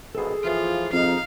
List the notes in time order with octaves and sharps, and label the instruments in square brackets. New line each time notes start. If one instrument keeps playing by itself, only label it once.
[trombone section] A#1 B2 [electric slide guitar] G#4 A4
[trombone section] E3 F3 [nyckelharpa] F4
[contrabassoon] F2 [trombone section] D#4 [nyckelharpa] F5